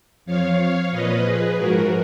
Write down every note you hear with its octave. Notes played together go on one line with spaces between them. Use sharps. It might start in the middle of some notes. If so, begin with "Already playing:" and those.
F2 F3 C#5 F5
A#2 F3 B4 D#5
G#4 B4
G#2 F3 F#4 A#4